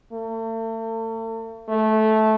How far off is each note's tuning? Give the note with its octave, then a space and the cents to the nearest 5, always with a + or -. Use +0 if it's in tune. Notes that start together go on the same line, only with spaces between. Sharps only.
A3 +40
A3 -15